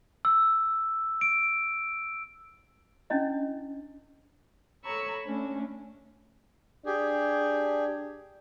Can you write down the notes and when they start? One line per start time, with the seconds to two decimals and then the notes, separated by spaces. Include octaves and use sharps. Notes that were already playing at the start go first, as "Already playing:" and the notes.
0.25 E6
1.21 D7
3.10 C#4 D4 E4 D#5
4.84 A4 C#5 A#5 B5 C#6 E6
5.25 A3 C#4 D4
6.86 D4 G4 G#4